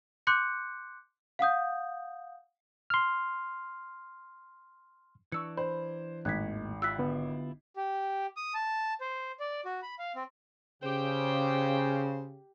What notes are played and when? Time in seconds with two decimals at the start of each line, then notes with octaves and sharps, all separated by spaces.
0.27 C6 D6 F#6 G6 C#7
1.39 F5 F#5 D#6 G6
2.90 C6 F6
5.32 E3 D4 C#6 E6 C#7
5.57 C5 B5
6.25 G#1 D#2 A2 F#6 G#6 B6
6.82 E4 F4 G4 E6 F#6 B6
6.99 D3 B3
7.76 G4
8.37 D#6
8.54 A5
9.01 C5
9.40 D5
9.65 F#4
9.82 B5
9.99 F5
10.15 C4
10.83 C#3 G4 C5 G5